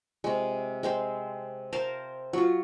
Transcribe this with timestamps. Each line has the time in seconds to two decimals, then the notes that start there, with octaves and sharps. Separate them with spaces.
0.24 C3 G#3
0.83 G#3 C4 C5
1.73 A#4 C5 F5 A5
2.33 F#3 F4